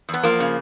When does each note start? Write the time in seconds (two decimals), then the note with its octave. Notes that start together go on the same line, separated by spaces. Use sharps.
0.09 E2
0.14 B3
0.23 F3 A#3
0.40 C#3